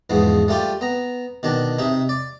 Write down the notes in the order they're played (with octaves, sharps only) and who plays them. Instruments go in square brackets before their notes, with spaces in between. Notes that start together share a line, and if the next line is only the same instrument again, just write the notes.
[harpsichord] E2 G#2 F3 B3
G3 A3 F4 G4
B3 A#5
B2 D#3 D4
C3 D#4 E5
D5